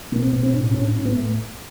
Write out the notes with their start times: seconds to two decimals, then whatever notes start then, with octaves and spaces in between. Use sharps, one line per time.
0.12 B2 A#3
0.22 C4
0.33 B2 B3
0.43 C4
0.53 A2 D4
0.64 C#4
0.74 A2 C#4
0.85 D4
0.95 A2 C#4
1.05 B3
1.16 A2 A3